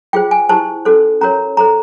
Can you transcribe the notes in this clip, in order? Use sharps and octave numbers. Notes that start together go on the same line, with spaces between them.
F4 G#4 C5 G5
G#5
E4 G4 C5 A5
C#4 F#4 A4 C5
C#4 F#4 A#4 C#5 A#5
F#4 A4 C5 A#5